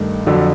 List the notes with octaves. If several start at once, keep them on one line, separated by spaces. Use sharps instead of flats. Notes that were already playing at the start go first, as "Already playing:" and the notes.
Already playing: G2 D#3 A3
F2 D3 F#3